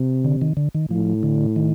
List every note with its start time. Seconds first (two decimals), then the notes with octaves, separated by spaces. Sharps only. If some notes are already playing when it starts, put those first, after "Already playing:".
Already playing: C3
0.24 D3
0.42 D#3
0.57 D3
0.75 D#3
0.90 A2 F3
1.23 D3
1.56 D#3